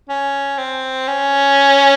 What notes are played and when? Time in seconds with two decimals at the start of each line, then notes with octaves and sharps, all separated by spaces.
0.09 C#4
0.57 C4
1.07 C#4